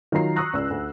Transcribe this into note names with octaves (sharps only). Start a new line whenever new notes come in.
D#3 F#3 F4 A#5 C7
A#5 C#6 D#6 E6 F#6 A#6
C#2 D5 E6
D2